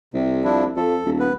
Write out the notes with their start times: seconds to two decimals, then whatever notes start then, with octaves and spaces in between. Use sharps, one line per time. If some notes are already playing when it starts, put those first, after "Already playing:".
0.14 C2 C3
0.44 F3 D4 E4
0.76 F2 A4
1.05 D#1
1.20 B3 B4